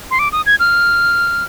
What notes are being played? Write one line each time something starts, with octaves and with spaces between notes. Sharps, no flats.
C6
D6
D#6
G#6
F6